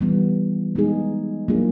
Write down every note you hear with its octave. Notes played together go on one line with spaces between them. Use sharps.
E3 G3 B3
G#3 B3 D#4 G#4
F#3 A#3 D4 F4 G#4